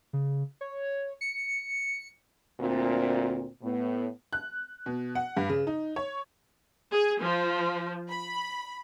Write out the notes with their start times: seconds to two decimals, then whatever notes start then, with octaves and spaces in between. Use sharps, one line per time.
0.13 C#3
0.61 C#5
1.21 C#7
2.61 D2 A#2 C4
3.63 A2 B3
4.33 F#6
4.86 B2
5.15 F#5
5.37 G2
5.49 C#3
5.67 D#4
5.96 C#5
6.92 G#4
7.23 F3
8.10 B5